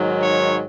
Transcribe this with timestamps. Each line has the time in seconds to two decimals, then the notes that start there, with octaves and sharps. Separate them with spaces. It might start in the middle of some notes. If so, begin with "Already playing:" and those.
Already playing: G#2 D#3 F#3
0.20 C#5